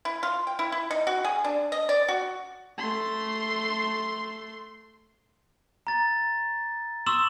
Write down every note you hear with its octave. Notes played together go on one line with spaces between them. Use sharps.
E4
F4
G5
E4
E4
D#4
F#4
G#4
D4
D#5
D5
F#4
A3 C6
A#5 A6
C6 C#6 D#6 E6 E7 F#7